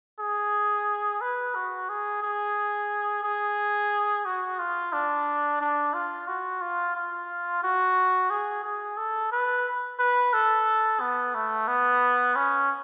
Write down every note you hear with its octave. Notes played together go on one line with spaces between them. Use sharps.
G#4
B4
F#4
G#4
G#4
G#4
F#4
F4
D4
D4
F4
F#4
F4
F4
F#4
G#4
G#4
A4
B4
B4
A4
B3
A3
B3
C#4